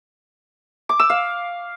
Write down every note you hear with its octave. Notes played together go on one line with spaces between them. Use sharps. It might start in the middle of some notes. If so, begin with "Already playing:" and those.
D6
E6
F5